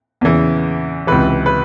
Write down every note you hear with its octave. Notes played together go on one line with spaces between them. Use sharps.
E2 C#3 E3
C#2 C3 E3 B4
B4